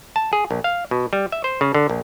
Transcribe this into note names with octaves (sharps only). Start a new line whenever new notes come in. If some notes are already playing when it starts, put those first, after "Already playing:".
A5
G#4
A#1
F5
B2
G3
E5
C5
C#3
D3
A#1